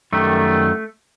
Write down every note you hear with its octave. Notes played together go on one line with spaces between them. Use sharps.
F#2 D#3 G3 A3